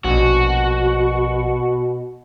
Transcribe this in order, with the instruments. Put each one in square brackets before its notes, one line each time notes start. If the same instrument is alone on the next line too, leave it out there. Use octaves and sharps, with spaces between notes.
[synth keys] A#1 [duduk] B2 [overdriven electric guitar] F#4